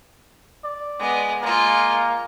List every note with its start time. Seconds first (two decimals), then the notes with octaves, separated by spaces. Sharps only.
0.64 D5
1.00 G#3 B3
1.42 G#3 A#3 F4